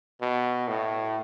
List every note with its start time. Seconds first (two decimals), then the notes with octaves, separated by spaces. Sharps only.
0.21 B2
0.68 A2